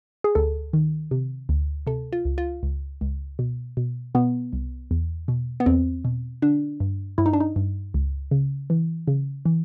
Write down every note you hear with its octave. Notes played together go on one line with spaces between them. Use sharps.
G#4
D2 A4
D#3
C3
D2
C3 A4
F4
C#2
F4
C#2
C#2
B2
B2
B2 B3
C2
E2
B2
B3
E2 C4
B2
D3 D4
G2
G2 E4
D#4
D4
D#4
G2
C#2
C#3
E3
C#3
E3